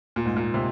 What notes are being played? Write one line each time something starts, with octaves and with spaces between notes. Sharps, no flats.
A#2
G#2
A#2
C3